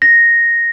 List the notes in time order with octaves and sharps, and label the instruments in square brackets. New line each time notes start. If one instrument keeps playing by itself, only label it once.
[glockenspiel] A#6